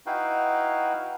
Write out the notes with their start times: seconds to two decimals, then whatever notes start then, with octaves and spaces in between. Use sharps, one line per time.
0.06 D#4 E4 F#4 B4 F5 G5